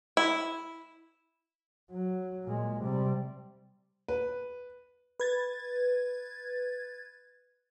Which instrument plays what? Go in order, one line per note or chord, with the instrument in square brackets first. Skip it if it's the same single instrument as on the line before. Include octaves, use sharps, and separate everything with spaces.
[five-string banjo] E4
[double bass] F#3
A#2 G#3
C3 G3
[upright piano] B4
[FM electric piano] B4 G#6 A6